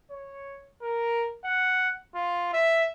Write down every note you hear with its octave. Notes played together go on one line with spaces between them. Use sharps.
C#5
A#4
F#5
F4
E5